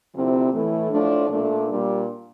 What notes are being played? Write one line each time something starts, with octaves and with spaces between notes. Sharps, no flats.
D2 C3 F3 C4 E4
A2 E3 A3
A2 F3 A3 D4
A#2 A3 D4
A#2 G3 D4